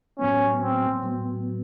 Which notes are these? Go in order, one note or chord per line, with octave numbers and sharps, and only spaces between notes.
A2 F#3 B3 C#4
C4
A2 F#3 B3